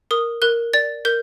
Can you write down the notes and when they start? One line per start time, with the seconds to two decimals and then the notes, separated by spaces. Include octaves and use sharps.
0.11 A#4 D#6
0.42 A#4 F#6
0.73 D5 A6
1.05 A#4 G6